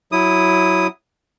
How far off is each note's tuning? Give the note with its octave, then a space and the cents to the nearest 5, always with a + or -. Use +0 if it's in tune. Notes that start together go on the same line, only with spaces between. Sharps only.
F#3 +0 E4 +0 D#6 -5